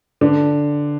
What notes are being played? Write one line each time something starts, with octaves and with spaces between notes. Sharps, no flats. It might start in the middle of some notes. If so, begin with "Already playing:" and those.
D3